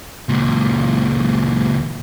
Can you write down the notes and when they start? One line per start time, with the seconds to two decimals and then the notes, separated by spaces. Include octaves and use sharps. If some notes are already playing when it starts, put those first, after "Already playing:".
0.29 C#2 A#2